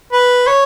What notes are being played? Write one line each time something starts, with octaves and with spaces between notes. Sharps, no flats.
B4
C#5